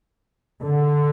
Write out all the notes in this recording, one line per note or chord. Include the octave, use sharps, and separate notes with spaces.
D3